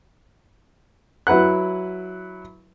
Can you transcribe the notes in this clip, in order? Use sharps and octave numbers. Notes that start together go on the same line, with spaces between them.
F#3 E4 B4 F#5 F#6